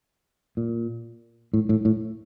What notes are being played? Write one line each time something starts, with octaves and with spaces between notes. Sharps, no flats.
A#2
A2
A2
A2